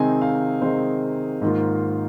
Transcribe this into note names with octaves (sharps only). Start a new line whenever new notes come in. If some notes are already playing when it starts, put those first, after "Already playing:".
Already playing: C3 D#3 G#3 C4 D#4 G#5
F5
C3 D#3 G#3 C4 D#4 C5
G#2 D#3 A#3 F4